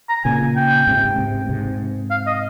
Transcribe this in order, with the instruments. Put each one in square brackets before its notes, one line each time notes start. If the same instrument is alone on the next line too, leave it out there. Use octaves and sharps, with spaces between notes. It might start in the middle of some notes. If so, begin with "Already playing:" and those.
[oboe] A#5
[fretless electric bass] A#2 C#3 [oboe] G#5
[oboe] G5
[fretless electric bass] G#2 C3
G#2 C3
G#2 C3
[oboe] F5
D#5